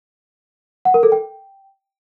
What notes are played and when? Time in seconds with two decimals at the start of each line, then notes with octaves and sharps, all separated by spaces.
0.85 F#5
0.94 A#4
1.03 A4
1.12 G5